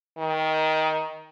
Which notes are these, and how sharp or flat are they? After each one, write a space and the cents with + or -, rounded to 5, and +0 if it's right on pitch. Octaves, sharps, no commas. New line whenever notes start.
D#3 +15